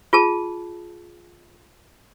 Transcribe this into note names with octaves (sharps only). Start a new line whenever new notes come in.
F4 G#4 A5